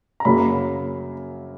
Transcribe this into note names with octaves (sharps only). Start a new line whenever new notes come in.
A#5
F#2 C#3 F#3 A#3 B5